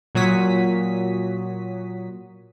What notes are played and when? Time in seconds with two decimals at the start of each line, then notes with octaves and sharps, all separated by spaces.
0.15 A#2 F#3 F#4 C#5 D#6 B6